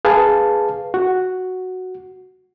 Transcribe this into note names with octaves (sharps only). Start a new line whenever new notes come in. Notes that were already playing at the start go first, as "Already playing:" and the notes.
G#4 B4 F5 A5
F#4